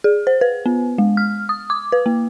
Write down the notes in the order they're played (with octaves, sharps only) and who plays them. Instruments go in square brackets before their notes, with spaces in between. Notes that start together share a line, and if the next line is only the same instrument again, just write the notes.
[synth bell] G#4
C5
B4
B3
G#3
F6
D#6
D6
B4
A#3